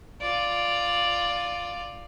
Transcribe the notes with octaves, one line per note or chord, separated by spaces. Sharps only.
F4 D5